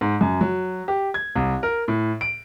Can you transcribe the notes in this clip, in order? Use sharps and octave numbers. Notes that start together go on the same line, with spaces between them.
G#2
F#2
F#3
G4
G#6
C2
A#4
A2
D7